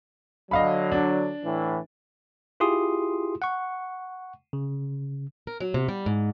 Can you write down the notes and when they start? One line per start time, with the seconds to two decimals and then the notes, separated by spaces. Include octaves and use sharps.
0.51 D3 F#3 D#5 F5 B5
0.92 D4
1.44 A2 E3
2.60 E4 F4 G4 G#4 C6 D#6
3.42 F#5 C#6
4.53 C#3
5.47 A#4
5.60 F#3
5.74 C3
5.89 G3
6.06 G#2